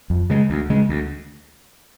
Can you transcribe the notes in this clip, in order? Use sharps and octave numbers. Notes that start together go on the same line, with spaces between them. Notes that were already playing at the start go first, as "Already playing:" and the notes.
F2
C#3 G#3
D2
C#3 G#3
D2